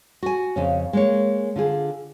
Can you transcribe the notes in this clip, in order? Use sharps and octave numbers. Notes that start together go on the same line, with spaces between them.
F#4 G#5
F2 C#3 C#4
G#3 A#3 C#5
D3 F4 G#4